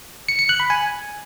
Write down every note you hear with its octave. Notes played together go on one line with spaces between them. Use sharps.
C#7
C#7
F#6
B5
G#5